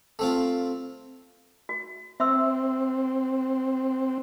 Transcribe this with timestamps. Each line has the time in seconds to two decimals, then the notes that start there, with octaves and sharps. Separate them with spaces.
0.19 A3 C4 F4
1.69 F#4
2.20 C4 E5 C6 E6